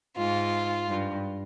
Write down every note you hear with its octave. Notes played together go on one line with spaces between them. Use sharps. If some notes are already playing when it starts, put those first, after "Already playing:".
G#2 F4
G2